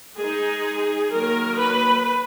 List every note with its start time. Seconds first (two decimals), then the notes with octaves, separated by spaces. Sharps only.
0.16 G#3 D#4 G#4
1.11 D#3 F#3 A#3 A#4
1.58 B4